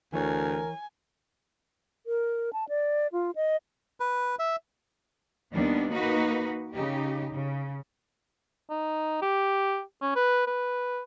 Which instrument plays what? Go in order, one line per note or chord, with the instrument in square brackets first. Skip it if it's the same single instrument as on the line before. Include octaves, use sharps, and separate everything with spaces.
[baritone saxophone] D2 [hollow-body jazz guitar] E3 C#5 [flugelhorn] A#4 [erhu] G#5
[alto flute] A#4
A5
D5
F4
D#5
[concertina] B4
E5
[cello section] D#2 D#3 G3 B3 D4 D#4
A#3 D#4 F#4 B4
C#3 D#4 G4
C#3
[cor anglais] D#4
G4
C#4
B4
B4